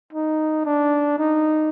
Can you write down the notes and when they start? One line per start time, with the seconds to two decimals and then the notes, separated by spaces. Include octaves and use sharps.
0.13 D#4
0.65 D4
1.18 D#4